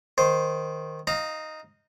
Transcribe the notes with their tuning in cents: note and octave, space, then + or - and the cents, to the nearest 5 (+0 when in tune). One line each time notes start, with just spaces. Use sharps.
D#3 +0 C5 +0
D#4 +0 F5 +15 A#5 -30